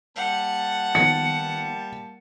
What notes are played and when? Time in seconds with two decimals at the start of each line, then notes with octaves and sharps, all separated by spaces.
0.16 G3 A#3 F#5 A5
0.95 D#3 F3 B3 C#7